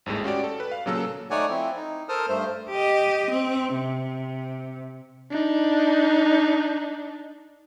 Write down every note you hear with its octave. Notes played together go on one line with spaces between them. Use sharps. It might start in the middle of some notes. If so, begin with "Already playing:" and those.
G#1 D#2 A2 G#3
C#4 F#4 G4 D5
A4
B4
F5
A#2 C#3 F#3 A#3 A4 E6
A3 D#4 C#5 D5 F#5 G#5
F3 C4 E4
D#4
A4 A#4 C5 A5 D#6 F6
G2 A3 C5
G4 D#5
C4
C3
D4 D#4